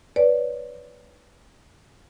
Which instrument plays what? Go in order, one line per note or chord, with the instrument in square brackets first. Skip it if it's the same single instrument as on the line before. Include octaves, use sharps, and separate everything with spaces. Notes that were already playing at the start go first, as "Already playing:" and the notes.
[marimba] B4 C#5 D5